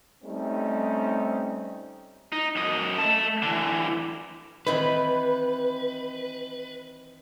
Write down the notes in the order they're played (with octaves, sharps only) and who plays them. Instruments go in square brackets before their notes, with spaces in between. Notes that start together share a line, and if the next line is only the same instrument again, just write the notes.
[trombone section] G3 A3 C4 C#4 D#4
[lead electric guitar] D#4
F#2 D#5
A3 A5
D3 E3
[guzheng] D#3 E3 C4 [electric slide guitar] B4